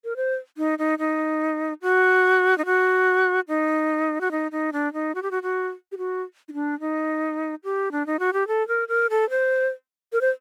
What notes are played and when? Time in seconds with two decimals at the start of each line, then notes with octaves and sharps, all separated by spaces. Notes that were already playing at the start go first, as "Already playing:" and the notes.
0.04 A#4
0.16 C5
0.57 D#4
0.79 D#4
0.99 D#4
1.82 F#4
2.58 D#4
2.65 F#4
3.48 D#4
4.21 F#4
4.31 D#4
4.52 D#4
4.73 D4
4.93 D#4
5.15 F#4
5.23 G4
5.31 F#4
5.43 F#4
5.92 G4
5.98 F#4
6.49 D#4
6.53 D4
6.80 D#4
7.64 G4
7.92 D4
8.06 D#4
8.19 F#4
8.33 G4
8.48 A4
8.68 A#4
8.88 A#4
9.10 A4
9.30 C5
10.13 A#4
10.21 C5